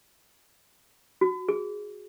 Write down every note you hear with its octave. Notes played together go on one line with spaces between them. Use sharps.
F#4
G#4